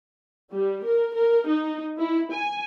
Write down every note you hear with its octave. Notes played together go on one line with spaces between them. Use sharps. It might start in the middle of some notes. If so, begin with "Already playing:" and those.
G3
A#4
A#4
D#4
E4
G#5